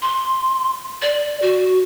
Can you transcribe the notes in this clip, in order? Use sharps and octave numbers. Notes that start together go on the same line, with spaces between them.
C6
D5
F#4